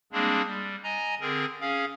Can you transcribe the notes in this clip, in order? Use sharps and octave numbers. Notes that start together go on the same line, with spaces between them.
G3 G#3 A#3 C4 D4 G#4
G3
D#5 G#5 A#5
D3 C4 G#4 A#4
C#4 G#4 F5